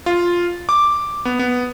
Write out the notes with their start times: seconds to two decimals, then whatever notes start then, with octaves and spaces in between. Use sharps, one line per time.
0.06 F4
0.69 D6
1.25 B3
1.39 B3